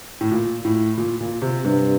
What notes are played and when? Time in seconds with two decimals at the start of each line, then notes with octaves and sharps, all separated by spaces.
0.21 A2
0.31 A#2
0.65 A2
0.97 A#2
1.20 A#2
1.42 C3
1.65 G2 C3